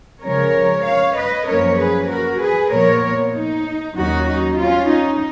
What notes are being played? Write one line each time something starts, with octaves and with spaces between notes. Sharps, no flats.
C#3 F3 G#3 C#4 A#4 C#5
C#5 F5
B4 D#5
F#2 F3 A#3 C#4 A#4 C#5
G#4 B4
F#4 A#4
G#4 B4
A#2 F3 B3 A#4 C#5
D#4
D#2 D#3 F#3 C#4 D#4 F#4
D#4
C#4 F4
D#4